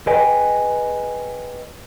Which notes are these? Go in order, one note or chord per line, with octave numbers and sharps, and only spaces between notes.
G#4 B4 C#5 D#5 G5 G#5